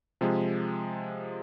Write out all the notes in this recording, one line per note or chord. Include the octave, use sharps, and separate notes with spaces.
C3 F3 G#3